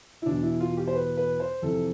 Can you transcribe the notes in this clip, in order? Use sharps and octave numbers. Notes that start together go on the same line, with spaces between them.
E4
E2 B2 D4
E4
F4
G4
C5
B4
B4
C5
F2 C3 E3 A4